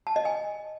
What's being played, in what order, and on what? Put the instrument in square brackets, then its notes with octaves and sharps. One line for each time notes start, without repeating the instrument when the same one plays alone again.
[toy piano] A5
D#5
G#5